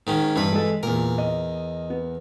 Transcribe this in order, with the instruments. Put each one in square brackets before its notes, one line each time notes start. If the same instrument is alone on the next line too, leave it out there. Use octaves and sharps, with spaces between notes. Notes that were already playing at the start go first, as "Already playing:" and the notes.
[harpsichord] G#2 D#3 C#4
[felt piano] G2 [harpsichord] E3 B4
[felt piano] G#3 A4
[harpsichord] E2 A#4 [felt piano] A#2
[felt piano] D#5
B3